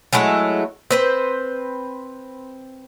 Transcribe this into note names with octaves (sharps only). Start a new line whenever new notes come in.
F#3 G#3 A3 E4
C4 B4 C5